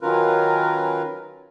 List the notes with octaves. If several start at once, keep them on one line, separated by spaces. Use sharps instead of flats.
D#3 F#3 C#4 F4 A#4 B4